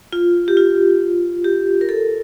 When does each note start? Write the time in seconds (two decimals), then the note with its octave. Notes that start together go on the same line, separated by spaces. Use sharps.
0.13 F4
0.48 G4
0.57 F4
1.45 G4
1.81 A#4
1.89 A4